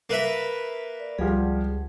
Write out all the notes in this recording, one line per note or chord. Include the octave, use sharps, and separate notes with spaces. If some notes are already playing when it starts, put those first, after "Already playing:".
A#3 B4 E5
D5
C#2 F3 G3 G#4 F#5